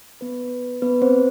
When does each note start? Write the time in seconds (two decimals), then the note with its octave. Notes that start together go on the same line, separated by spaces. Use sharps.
0.21 B3 B4
0.82 B3 B4
1.02 C4 C5